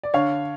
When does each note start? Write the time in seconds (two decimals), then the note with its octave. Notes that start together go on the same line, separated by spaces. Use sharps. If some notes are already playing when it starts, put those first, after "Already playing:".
0.03 D5
0.14 D3 C#5 F5